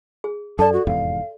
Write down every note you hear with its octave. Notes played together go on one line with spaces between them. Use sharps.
G#4
F#2 A4 D5 A5
F#4
F1 E2 G#2 F5